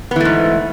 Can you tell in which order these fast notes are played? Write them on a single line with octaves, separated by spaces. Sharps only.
B3 E3 A3 G#2